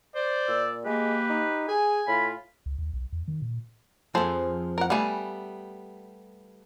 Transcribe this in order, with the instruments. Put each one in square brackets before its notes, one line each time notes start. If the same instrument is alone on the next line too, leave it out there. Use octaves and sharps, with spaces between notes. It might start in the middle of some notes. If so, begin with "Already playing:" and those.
[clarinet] C5 [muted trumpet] D5
[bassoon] A#2 [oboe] E6
[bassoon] G#3 [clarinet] A#3 [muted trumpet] G4 [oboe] B4
[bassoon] D#4
[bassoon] G#4 [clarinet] G#5
[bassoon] A2 [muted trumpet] F4 [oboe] B5
[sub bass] C#2
D#2
B1
E2
D#3
A#2
[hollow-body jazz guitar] F2 F3 [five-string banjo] G#4 A4 C5
[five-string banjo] A#4 F#5
[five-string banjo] G3 A3 B3 [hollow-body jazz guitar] F5 G#5